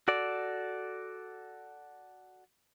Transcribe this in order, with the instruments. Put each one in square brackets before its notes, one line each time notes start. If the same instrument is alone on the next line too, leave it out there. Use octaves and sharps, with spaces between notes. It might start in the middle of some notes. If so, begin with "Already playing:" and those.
[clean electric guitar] F#4 A4 D5